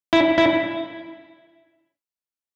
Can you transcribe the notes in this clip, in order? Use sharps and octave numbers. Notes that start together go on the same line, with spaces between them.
E4
E4